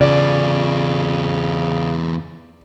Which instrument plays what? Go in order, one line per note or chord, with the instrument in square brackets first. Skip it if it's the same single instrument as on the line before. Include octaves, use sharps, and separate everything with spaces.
[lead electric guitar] E2 F4 [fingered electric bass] C#3 [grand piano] D5